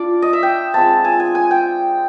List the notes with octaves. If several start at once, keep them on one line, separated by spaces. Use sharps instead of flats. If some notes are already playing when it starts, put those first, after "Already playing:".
Already playing: D4 F4 D5
D#5
E5
G5
G#3 C4 F4 A5
G#5
G#5
G#5
G5